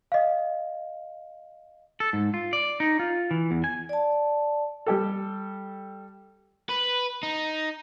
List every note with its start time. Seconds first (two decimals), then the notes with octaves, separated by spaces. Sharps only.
0.12 D#5 F5
2.00 A4
2.13 G#2
2.34 F4
2.53 D5
2.80 D#4
2.99 F4
3.31 E3
3.51 E2
3.64 G#5
3.89 D5 A5
4.86 G3 G4 A4
6.70 B4
7.23 D#4